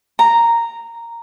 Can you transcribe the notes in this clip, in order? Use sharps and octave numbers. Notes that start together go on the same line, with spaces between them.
A#5